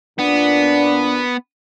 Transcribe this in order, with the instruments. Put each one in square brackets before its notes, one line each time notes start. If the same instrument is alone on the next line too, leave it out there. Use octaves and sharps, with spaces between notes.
[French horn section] A#2 D4 [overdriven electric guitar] B3